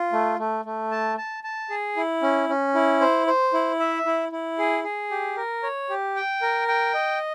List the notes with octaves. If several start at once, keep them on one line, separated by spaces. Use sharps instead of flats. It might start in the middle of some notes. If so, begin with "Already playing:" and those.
Already playing: F4
A3
A3
A3
A5
A5
A5
G#4
E4
C#4
C#4
E4
C5
C5
E4
E5
E4
E4
G#4
G#4
G4
A#4
C#5
G4
G5
A#4
G5
D#5